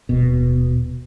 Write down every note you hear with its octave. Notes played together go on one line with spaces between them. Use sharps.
D#1 B2